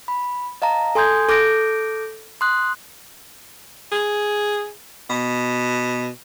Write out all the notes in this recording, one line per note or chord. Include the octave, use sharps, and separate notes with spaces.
B5
D#5 F5 A5 A#5
A4 G#5 C6 D#6 G6 G#6
A4 D6 F6 G6 A#6 D7
C6 D#6 F#6
G#4
B2